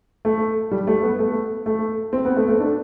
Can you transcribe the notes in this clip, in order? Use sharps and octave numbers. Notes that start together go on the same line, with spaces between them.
A3
G3
A3
B3
A3
A3
C4
B3
A3
A3
D4